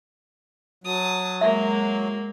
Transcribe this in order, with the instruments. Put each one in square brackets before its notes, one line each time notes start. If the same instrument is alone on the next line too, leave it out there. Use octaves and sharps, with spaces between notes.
[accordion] F#3 [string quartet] A5 D#6
[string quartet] G#3 A#3 [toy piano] E5